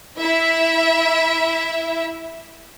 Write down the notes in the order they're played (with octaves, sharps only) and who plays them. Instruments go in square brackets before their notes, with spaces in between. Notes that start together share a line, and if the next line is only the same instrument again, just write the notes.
[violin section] E4 E5